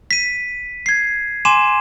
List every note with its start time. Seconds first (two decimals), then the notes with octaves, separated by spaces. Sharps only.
0.11 B6 D#7
0.86 G#6 C7
1.45 G#5 C6 D6 D#7 E7